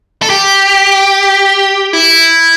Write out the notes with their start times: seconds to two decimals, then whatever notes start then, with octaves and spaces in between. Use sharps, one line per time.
0.22 A4
0.30 G4
1.93 E4